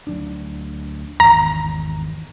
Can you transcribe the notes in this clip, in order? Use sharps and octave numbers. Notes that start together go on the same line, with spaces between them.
D2 F#3 D4
G#1 E2 A#5